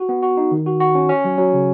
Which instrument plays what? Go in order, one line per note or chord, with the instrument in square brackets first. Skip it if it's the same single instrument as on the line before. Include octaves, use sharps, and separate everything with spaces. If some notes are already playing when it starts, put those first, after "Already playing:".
Already playing: [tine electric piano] F#4
B3
F#4
D#4
D#3
F#4
F#4
C#4
C#4
F#3
F#3
C#3